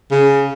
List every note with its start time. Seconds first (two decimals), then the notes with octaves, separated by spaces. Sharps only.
0.11 C#3